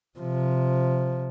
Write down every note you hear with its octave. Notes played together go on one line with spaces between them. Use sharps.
C3 F3